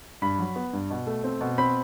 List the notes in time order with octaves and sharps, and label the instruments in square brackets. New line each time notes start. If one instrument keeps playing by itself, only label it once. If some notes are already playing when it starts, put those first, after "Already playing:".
[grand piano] G2 B5
F#3
B3
G2
B2
A3
C4
B2
C4 B5